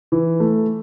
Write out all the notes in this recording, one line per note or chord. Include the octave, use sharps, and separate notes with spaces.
E3
A3